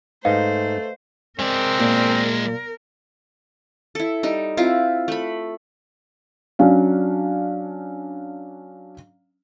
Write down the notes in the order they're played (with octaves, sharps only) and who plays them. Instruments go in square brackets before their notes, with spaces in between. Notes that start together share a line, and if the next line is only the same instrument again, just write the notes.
[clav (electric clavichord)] G#2 D#4 [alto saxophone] A3 [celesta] B4 D#5 F5 [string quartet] C5
[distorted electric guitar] G#3 D5 [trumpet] C4 [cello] A#4
[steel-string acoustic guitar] A#2
[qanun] E4 A4
G3 D#4
C4 E4 F4
A3 B5
[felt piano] F#3 C#4 D4 F5